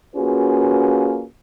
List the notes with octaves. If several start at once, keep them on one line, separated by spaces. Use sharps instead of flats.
A#3 C#4 F4 F#4 G#4 B4